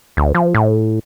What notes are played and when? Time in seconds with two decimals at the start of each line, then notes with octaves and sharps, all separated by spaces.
0.17 D2
0.35 F3
0.54 A2